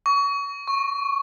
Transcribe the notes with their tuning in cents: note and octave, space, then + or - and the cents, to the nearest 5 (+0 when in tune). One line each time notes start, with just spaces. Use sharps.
C#6 +30
C#6 -10